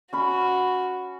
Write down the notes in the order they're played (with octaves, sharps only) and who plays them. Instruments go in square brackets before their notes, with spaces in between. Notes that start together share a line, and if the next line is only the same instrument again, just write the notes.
[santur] C#4 B5 [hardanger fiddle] F#4